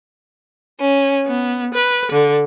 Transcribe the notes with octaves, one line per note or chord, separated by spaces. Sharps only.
C#4
B3
B4
D3